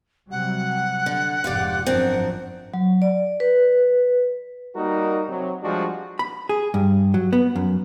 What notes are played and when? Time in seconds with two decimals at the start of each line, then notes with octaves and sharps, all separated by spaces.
0.31 C3 F#3 G3 F#5
1.06 D3
1.44 F1 G#2 F4 G4 D5
1.86 G#1 F#2 F3 C4 D4 A#4
2.74 F#3
3.02 D5
3.40 B4
4.76 G3 A#3 D#4 F#4 A#4
5.29 C3 F#3
5.63 F3 G3 G#3 D4 F#4
6.19 B5
6.49 G#4
6.74 G2
7.14 F#3
7.33 B3
7.56 F#2